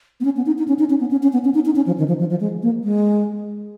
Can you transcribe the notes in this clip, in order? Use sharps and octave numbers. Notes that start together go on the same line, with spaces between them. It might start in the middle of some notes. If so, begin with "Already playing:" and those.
B3
C#4
B3
D#4
D#4
C#4
D#4
C#4
B3
C#4
C#4
B3
C#4
D#4
D#4
C#4
F3
D#3
F3
F3
F3
G#3
A#3
G#3